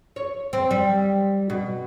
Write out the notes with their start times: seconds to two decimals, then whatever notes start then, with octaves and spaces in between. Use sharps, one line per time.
0.16 C#5
0.53 C4
0.71 G3
1.50 B2